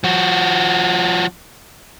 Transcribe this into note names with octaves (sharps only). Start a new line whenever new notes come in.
F3 F#4